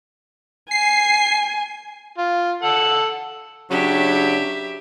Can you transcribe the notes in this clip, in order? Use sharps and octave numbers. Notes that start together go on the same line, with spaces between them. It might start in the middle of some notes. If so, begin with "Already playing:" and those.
G#5 C7
F4
A4 F#5
C#3 F#3 D4 G4 E5